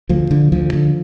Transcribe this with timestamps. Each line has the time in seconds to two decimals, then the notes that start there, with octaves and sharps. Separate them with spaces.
0.09 D2 F3
0.31 D3
0.52 D2 F3
0.73 D3